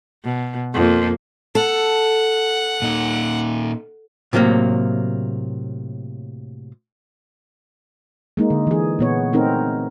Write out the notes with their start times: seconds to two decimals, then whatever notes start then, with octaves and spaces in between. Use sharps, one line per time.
0.25 B2
0.75 F2 A#3
1.55 A4 F#5
2.82 A#2 D#4
4.33 A2 C3 F#3 G#3 A#3
8.37 G#3 A#3 D#4
8.50 D3
8.67 E3 G#4
8.99 A#2 B3 C#5
9.33 A3 C4 D#4 A#4